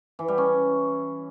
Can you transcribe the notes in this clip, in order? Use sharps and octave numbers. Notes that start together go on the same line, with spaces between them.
E3
G3
C#4